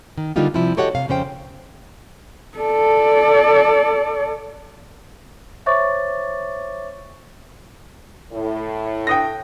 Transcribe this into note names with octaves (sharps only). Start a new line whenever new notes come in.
D#3
D3 G3 A#3 D#4 F4 G4
C3 F3 G3 E4
F#4 G4 A4 C#5 D#5 F#5
C3 F5
F2 C#3 C#4 C5 G5
A4 D5
C5 C#5 E5 C#6 D6 A6
A2
G5 D#6 A#6